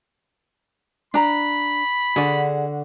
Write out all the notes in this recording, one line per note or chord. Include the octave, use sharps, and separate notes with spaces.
D4 A#5 B5
D3 F#4 G#4 D5